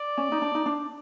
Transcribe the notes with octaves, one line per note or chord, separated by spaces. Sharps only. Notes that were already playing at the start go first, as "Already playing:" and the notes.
Already playing: D5
C#4
D#4
D4
D#4
D4